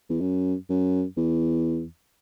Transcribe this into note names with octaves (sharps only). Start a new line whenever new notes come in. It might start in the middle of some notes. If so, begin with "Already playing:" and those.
E2
F#2
F#2
E2